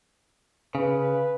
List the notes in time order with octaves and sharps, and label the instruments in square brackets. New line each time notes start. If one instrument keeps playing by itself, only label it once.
[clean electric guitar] C#3 [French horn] B4